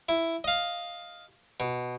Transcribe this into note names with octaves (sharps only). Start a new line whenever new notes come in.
E4
D#5 F5
B2